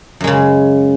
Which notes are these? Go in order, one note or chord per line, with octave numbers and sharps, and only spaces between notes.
F#2 C#3 G#3